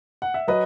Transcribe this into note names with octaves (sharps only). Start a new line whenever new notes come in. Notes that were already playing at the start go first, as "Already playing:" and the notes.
F#5
E5
F#3 B4 D#5